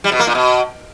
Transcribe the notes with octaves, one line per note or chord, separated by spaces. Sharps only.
G3
B2
A#3
A#2
B2